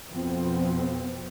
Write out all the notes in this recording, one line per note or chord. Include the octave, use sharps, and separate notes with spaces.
F2 B2 F3 B3 C4